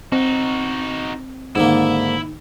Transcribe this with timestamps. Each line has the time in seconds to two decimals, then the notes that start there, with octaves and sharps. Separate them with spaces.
0.12 C4 D#4 F#4
1.55 G#2 D3 D#3 A#3 E4